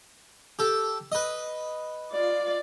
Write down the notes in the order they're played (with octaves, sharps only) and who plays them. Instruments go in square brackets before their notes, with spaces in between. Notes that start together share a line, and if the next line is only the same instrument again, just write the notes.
[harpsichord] G4 A4
B4 D#5
[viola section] F4 D5